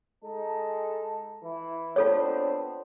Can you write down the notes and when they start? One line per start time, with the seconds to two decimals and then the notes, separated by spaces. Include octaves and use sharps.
0.24 G#3 D#4 A4
1.43 E3 E4
1.96 B3 C4 D4 F4 A4 C#5